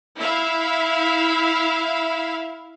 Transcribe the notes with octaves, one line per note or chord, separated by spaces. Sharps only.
E4 E5 F5